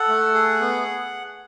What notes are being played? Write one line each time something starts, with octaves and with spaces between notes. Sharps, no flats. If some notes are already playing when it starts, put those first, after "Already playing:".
Already playing: A4 F#5
A3
G#4
B3